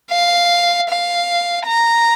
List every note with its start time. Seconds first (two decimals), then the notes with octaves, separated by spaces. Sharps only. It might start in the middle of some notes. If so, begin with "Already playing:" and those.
0.10 F5
0.89 F5
1.66 A#5